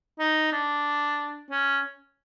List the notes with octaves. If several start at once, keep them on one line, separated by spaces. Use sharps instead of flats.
D#4
D4
C#4